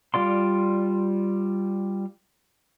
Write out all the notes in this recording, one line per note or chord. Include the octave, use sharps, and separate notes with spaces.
G3 F4 D5 C6